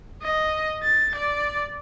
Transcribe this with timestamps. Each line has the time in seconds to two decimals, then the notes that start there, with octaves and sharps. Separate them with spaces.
0.22 D#5
0.83 A6
1.15 D5